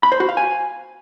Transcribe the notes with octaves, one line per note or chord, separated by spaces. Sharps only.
B5
C5
F#4
F5
G#5